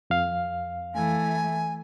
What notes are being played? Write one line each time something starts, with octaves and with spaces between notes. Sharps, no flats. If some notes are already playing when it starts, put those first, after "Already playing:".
F2 F5
E3 A3 G#5